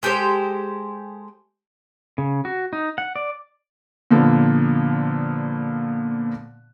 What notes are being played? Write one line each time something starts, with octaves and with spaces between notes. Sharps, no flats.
G#3 G4 A4 C5
C#3
F#4
D#4
F#5
D5
A#2 D3 F3 B3